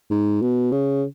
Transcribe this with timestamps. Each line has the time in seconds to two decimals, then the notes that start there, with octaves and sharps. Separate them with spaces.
0.11 G#2
0.42 B2
0.72 C#3